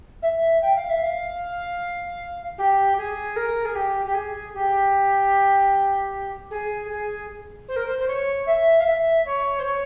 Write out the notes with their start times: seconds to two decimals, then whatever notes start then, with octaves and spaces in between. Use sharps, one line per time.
0.22 E5
0.61 G5
0.75 F5
0.89 E5
1.02 F5
2.58 G4
2.97 G#4
3.36 A#4
3.65 G#4
3.75 G4
4.05 G4
4.14 G#4
4.54 G4
6.50 G#4
6.89 G#4
7.68 C5
7.76 A#4
7.86 C5
7.98 C5
8.07 C#5
8.46 E5
8.80 F5
8.86 E5
9.25 C#5
9.59 C5
9.63 C#5